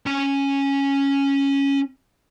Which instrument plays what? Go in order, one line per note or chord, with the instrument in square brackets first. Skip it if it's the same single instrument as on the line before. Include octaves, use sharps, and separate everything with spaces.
[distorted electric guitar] C#4 G#5